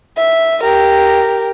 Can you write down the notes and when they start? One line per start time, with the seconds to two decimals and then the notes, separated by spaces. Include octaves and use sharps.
0.17 E5
0.64 G4 A#4